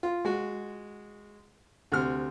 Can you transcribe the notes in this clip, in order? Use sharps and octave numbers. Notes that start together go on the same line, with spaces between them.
F4
G#3 F#4
D2 C3 F6